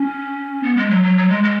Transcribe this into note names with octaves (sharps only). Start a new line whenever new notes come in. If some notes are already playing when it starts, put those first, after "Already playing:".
Already playing: C#4
B3
G#3
F#3
F#3
F#3
G#3
G#3